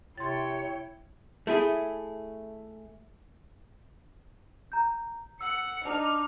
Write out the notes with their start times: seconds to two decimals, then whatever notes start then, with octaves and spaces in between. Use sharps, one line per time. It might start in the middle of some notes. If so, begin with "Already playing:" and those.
0.17 C3 E4 C#5 G5 C6 A6
1.47 A3 E4 G#4
4.72 A#5 G6
5.41 F#5 E6 C#7
5.85 D4 D#4 D5 F6